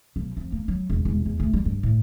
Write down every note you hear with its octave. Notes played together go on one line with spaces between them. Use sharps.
B1
F2
A#3
F#3
E1
E1
E2
D2
G3
G2
A2